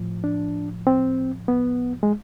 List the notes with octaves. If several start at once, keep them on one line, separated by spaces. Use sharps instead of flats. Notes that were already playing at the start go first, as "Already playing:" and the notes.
Already playing: A2 F3
D4
C4
B3
G#3